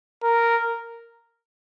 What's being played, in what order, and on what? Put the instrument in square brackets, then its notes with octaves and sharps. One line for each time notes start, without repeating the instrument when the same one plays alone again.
[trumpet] A#4